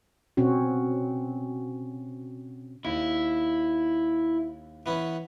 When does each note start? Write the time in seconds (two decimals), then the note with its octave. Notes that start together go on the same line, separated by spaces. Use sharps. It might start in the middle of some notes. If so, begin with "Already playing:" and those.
0.37 B2 C4 C#4 F#4
2.85 D#2 E4
4.86 E3 B3 C#4